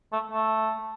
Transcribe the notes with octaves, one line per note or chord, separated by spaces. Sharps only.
A3
A3